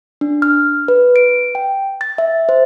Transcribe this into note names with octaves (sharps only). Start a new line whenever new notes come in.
D4
F6
B4
D7
G5
A6
E5
C5